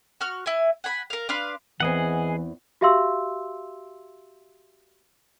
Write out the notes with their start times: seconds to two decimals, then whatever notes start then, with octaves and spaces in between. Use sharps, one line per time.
0.21 F#4 C#6 F6
0.46 E4 G#5
0.84 F#5 G#5 B5
1.10 A#4 F5
1.29 D4 B4 F5 C6
1.80 E2 E3 C4 G#4 D#5 F#5
2.81 F#4 G4 E5 F5 C6 E6